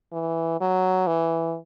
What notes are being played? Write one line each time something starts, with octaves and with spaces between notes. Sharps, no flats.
E3
F#3
E3